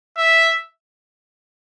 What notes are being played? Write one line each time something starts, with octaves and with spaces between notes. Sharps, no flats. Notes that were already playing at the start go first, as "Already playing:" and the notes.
E5